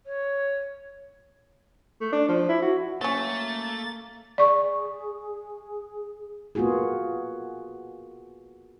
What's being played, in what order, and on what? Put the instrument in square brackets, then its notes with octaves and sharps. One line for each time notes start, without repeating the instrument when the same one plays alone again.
[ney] C#5
[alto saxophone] A3
D4
F3
E4
F#4
[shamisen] F#3 C#4 [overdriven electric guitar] A3 [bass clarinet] A#3 [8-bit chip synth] A6
[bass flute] G#4 [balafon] D5 C#6
[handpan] A#3 B3 F4 F#4 G#4